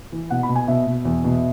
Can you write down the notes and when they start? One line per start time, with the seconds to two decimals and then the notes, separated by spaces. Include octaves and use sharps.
0.12 E3
0.30 B2 F#5
0.43 B5
0.49 B2
0.55 G#5
0.67 B2 E5
0.86 B2
1.05 E2
1.24 B2